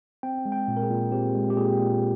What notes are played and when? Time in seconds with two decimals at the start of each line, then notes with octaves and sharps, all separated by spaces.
0.23 C4 G5
0.46 G#3
0.52 G5
0.68 A#2
0.77 A#4
0.83 G#4
0.90 A#2
1.12 C4 G4
1.35 G#3
1.50 G4
1.57 A#2 G#4
1.79 A#2